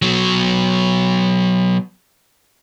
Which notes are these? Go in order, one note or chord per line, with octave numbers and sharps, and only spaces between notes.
B2 F#3